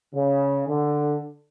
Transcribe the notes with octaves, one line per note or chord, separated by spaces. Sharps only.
C#3
D3